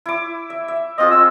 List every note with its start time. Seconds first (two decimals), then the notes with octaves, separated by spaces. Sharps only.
0.06 E4 D6
0.50 E5
0.68 E5
0.98 C4 F4 G#4 D#5
1.11 E6